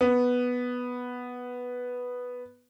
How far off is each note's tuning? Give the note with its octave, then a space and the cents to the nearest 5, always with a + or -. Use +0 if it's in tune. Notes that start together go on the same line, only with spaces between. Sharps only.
B3 +0